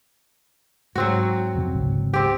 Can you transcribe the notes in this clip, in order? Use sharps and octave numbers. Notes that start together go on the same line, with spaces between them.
G#2 F#3 C4 F#4
F2 C3
G#1 C#2
C4 G4